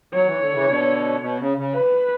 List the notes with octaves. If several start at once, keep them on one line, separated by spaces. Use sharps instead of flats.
F#3 C#5
E3
D3
C#3 E3
B2 D3
B2
C#3
C#3
B4